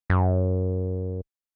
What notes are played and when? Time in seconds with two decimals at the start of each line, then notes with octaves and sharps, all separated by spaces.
0.10 F#2